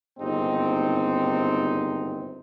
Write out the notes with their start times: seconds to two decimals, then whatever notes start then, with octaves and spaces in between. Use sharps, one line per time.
0.19 G1 D#2 G#2 C3 C4 D#4